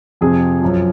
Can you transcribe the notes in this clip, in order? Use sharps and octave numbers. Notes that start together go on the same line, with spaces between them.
F2 C3 F3 G#4
F#2 F3